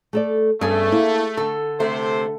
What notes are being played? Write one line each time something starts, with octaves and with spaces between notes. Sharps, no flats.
A3 A4 D5
G2 A3 B3 C#4 G#4 A4
A#3 E4
D3 A4
C3 A3 C5